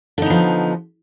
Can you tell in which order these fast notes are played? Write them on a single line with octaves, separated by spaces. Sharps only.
D3 D#4 B3 F3